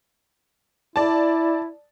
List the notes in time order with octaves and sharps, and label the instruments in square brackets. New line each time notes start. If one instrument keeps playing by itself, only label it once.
[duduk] E4 [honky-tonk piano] D5 A5